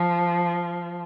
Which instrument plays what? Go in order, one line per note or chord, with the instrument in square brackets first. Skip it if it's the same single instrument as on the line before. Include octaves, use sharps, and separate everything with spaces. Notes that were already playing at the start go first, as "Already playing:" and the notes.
Already playing: [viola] F3